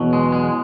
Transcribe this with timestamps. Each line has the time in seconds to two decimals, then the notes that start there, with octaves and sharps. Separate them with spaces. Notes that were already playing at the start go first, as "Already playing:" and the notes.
Already playing: E2 B2 F#3
0.13 G#3
0.32 G#3